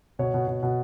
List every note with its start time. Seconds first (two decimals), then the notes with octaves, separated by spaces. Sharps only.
0.19 B2 C#5
0.34 B2
0.47 B2
0.63 B2